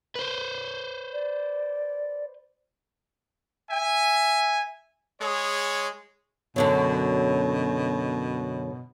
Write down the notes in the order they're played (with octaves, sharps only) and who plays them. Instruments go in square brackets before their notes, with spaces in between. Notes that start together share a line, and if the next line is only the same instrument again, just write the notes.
[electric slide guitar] B4 C5
[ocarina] D5
[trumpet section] E5 G#5
G#3 G#4 C#5
[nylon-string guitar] F#2 D3 F#3 [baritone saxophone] B2